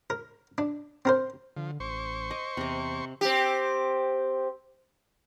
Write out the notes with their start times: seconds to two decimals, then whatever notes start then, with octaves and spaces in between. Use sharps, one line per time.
0.10 A#4
0.58 D4
1.05 C4 A#4 C5
1.56 D3 F3
1.80 A1 C5 C#6
2.31 D#5
2.57 E2 C3 D#5
3.21 C4 G4